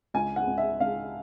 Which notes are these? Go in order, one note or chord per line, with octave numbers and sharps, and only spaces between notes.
C#2 G#5
F#5
C#2
E5
C#2 F5